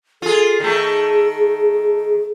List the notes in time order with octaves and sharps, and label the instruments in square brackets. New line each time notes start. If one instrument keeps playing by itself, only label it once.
[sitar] F4 G#4 [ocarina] A4
[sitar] D#3 A3 [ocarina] G#4